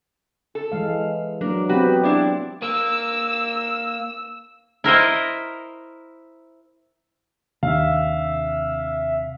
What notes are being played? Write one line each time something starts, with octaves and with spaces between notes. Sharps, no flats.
A4
E3 G#3 F5
F#3 A#3 D4 A#4
B3 C4 F#4 G4 B4
D4 E4 D5
A#3 E6
E4 A#4 C5 D#5
D#2 C3 D4 E5 F5